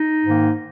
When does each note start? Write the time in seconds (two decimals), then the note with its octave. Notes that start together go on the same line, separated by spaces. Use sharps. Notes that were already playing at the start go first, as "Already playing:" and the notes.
Already playing: D#4
0.24 G#2 D#3 A#3